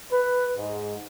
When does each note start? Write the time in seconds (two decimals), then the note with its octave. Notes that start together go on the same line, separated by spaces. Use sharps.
0.11 B4
0.57 G#2